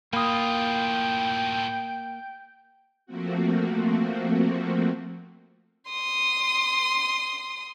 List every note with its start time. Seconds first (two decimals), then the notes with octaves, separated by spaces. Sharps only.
0.13 A2 A#3 F4 G5 B5 D#6
3.06 F3 A3 A#3 C4 F#4
5.90 C6 D#6